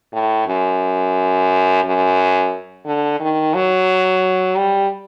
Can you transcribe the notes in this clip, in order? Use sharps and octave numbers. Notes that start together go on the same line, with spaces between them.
A2
F#2
F#2
D3
D#3
F#3
G3